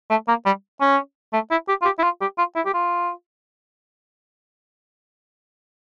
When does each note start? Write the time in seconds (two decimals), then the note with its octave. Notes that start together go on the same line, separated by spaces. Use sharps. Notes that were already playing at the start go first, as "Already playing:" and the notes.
0.10 A3
0.28 A#3
0.46 G3
0.81 C#4
1.33 A3
1.51 E4
1.68 G4
1.82 F4
1.85 G4
1.99 E4
2.03 F4
2.21 G4
2.38 F4
2.55 E4
2.65 G4
2.74 F4